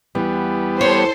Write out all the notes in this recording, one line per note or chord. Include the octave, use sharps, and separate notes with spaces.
E2 E3 G3 B3
A4 C5 C#5